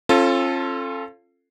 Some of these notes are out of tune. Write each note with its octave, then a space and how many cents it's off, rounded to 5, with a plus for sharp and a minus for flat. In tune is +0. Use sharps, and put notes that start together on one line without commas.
C#4 -45 F4 -10 A4 +0